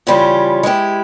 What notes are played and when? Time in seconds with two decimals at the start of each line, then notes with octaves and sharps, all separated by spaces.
0.07 C#3 E3 G3 C#4 F4
0.63 G#3 E4 G4